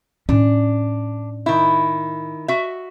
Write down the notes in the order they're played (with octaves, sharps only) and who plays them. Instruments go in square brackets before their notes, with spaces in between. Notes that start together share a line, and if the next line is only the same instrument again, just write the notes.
[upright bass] A2 C#4 [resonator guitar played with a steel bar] D4
[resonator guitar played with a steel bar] D#3 E4
F#4 E5